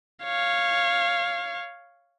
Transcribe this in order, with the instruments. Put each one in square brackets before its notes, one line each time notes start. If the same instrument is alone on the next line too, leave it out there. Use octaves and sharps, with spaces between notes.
[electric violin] C#5 F5